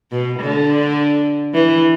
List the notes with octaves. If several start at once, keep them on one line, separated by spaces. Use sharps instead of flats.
B2
D3
E3